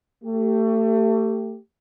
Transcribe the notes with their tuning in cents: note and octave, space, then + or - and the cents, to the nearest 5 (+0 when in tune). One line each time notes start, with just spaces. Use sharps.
A3 +30 G4 +0